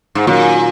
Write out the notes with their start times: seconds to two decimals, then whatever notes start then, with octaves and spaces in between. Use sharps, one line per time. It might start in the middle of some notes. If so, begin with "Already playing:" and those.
0.15 G#2
0.26 A#2 D#3 F#3 C#4 F#4 A#4